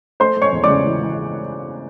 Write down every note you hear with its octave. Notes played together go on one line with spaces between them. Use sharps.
A3 C5 C6
A3
C#5 C#6
E2
C#3 D5 D6
E3
E3